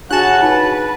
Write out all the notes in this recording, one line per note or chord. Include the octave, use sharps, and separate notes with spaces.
C#3 D4 F#4 F#5 A5 F#6
D#4 B4